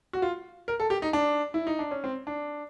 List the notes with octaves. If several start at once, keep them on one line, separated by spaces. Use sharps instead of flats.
F#4
F4
A#4
A4
G4
D#4
D4
E4
D#4
D4
C#4
C4
D4